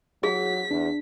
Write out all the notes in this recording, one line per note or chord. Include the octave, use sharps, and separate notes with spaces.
F#3 G#4 B6
E2 D4